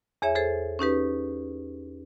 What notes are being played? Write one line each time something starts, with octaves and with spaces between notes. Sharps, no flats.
E2 G#4 C#5 E5
G#4 A4 C5
C#4 D#4 G4 B4